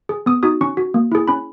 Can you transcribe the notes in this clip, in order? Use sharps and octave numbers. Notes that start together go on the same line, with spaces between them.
G#4
B3 D#6
D#4 F#4 D#6
C#4 C#6
F#4
A#3
E4 G#4
C#4 B5